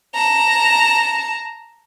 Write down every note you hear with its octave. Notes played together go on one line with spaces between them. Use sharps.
A5 A#5